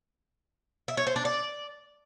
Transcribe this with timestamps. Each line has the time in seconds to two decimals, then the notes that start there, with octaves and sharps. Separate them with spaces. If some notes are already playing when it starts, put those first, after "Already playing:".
0.88 E5
0.97 C#5
1.07 C5
1.16 D4
1.25 D5